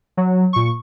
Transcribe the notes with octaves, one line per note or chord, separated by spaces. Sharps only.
F#3
A#2 C#6